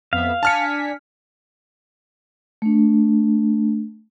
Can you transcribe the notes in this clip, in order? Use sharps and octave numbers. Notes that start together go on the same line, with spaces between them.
F2 B3 E5 F5
D4 G#5 A5 F6 B6 C#7
A3 D4